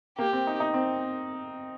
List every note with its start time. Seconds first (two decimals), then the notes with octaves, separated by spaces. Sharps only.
0.19 A#3 G4
0.33 C4
0.47 D#4
0.60 D#4
0.74 C4